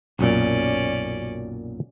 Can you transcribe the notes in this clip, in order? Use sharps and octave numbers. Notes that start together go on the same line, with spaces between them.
B1 F#2 A#2 C#4 D5